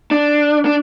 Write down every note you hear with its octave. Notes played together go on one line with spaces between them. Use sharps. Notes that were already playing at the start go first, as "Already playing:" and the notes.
D4
D4